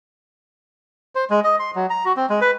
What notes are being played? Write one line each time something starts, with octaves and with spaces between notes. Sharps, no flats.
C5
G#3
D#5
C6
F#3
A#5
F#4
C4
G#3
B4